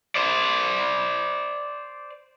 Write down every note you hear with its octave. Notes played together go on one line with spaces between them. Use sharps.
C5 D5